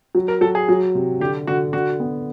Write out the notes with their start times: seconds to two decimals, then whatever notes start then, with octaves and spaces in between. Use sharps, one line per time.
0.15 F#3
0.28 A#4
0.41 F#3 A4
0.55 G#4
0.69 F#3
0.95 C3
1.20 D3 G4
1.47 D3 F#4
1.73 D3 F#4
2.00 B3